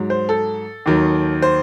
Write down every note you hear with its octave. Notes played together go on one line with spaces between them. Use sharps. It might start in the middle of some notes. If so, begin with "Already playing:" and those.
Already playing: G#2 F#3
C5
A4
D#2 D#3 F#3
C5